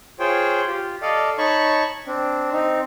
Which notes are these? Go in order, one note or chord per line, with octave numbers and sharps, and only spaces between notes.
F4 G#4 C5 C#5 G5
F4 G4
A4 D5 D#5 F5
D#4 C#5 A5 B5 C#6
C4 D4
C4 D#4